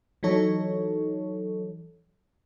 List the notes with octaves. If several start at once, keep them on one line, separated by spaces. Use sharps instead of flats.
E3 F#3 D#4 A4 C#5